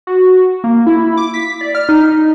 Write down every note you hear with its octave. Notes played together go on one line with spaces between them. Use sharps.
F#4
A#3
E4
D6
B6
D5
F6
D#4